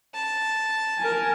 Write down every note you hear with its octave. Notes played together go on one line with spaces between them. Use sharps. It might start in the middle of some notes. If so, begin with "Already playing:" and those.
A5
A#4 G#5